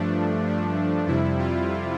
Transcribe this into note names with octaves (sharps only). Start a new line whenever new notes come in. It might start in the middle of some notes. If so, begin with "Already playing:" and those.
Already playing: G2 F3 A3 D4
G2 F3 A3
F2 C3 G3 E4
F4